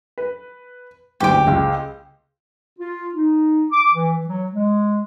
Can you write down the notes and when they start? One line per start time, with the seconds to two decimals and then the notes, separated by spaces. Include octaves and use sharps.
0.18 B4
1.20 F#1 D2 G2 G4 D6
1.47 C#2
2.79 F4
3.14 D#4
3.72 D6
3.92 E3
4.27 F#3
4.52 G#3